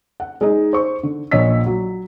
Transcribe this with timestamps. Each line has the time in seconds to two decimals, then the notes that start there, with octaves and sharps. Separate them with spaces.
0.20 F#5
0.41 G#3 D#4
0.73 C5 C#6
1.03 D3
1.31 A#1 A#2 C#5 D#5 E6 B6
1.66 F#3